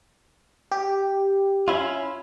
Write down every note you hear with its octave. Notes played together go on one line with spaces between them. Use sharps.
G4
C#4 E4 F4